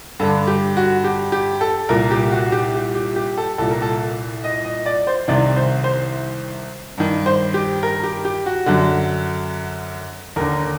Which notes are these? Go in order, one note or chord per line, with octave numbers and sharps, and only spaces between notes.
G2 D3 A4
G4
F#4
G4
G4
A4
C2 A#2 A#4
G4
F#4
G4
G4
G4
G4
A4
C2 A#2 A4
A#4
A4
D#5
D#5
D5
C5
C2 C3 D#3 D5
C5
C5
G2 D#3
C5
G4
A#4
G4
G4
F#4
F#2 D3 F#4
D#2 D3 A#4